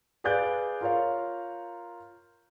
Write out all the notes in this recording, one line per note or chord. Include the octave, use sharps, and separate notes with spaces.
G#4 B4 D5 F5 F#6 G6
F4 A#4 C#5 F5